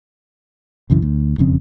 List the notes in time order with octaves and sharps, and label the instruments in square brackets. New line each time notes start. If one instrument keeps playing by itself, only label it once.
[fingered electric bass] B1 F#2 C#3 E3
D2
E1 F2 C#3 C4